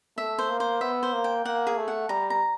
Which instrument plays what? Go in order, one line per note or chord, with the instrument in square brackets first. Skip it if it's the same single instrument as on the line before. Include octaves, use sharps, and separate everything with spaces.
[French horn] A3 [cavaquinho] E5
[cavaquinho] C5
[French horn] A#3
[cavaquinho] C5
[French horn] B3 [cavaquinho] E5
[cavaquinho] C5
[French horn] A#3
[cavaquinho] G5
[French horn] A#3 [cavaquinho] F#5
[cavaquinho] G#4
[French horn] A3
[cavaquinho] F#5
[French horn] G3 [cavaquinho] A#5
[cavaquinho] A#5